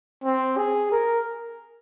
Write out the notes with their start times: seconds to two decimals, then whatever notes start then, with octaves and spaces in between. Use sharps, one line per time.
0.24 C4
0.57 G#4
0.92 A#4